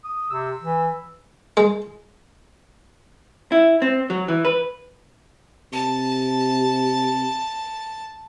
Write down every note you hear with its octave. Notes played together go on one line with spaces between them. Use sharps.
D#6
C3 E6
E3
G#3
E4
C4
F#3
E3
B4
C3 A5